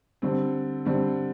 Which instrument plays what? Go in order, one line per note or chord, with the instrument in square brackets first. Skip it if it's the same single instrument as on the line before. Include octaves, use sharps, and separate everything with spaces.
[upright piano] D3 G3 C4
D3 G3 C4